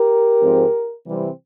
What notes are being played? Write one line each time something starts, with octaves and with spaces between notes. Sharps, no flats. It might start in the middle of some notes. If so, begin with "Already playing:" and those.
Already playing: G4 A#4
G#2 F3 G#3 C4
C3 E3 G3 C4